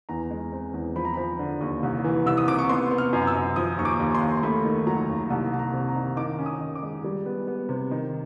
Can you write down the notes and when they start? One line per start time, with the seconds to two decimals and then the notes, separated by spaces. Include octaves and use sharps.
0.09 E2 A#5
0.31 G#3
0.52 C4
0.74 E2
0.96 F3 B5
1.05 A#5
1.14 F3 B5
1.39 D3
1.61 D#2
1.83 C2
2.04 E3
2.26 C2 E6
2.37 D#6
2.48 C3 D6
2.59 C#6
2.69 B3 C6
2.91 B3
2.98 F6
3.13 F#2
3.27 E6
3.35 F#2
3.56 F3 D#6
3.78 D#2 C#6
3.85 D6
4.00 D#2
4.15 C6
4.21 D#2
4.43 A3 B5
4.65 D#3
4.87 F#3 A#5
5.09 D#2
5.30 C2 A5
5.52 C2 A5
5.59 A#5
5.73 C3
5.89 A#5
5.95 D#3
6.17 D#3 D6
6.38 C#4
6.46 D#6
6.60 D#3
6.75 D6
6.83 G#3
7.04 G3
7.26 B3
7.47 B3
7.69 C3
7.91 D#3